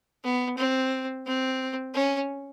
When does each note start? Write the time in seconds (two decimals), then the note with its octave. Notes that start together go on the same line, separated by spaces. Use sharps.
0.24 B3
0.57 C4
1.26 C4
1.94 C#4